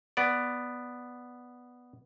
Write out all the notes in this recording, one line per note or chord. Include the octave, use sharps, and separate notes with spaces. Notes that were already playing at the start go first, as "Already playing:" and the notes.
B3 D5